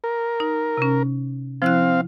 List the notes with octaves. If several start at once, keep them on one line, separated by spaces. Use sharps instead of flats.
A#4
D#4
C3 C#4
F3 C4 E4 F5 F#6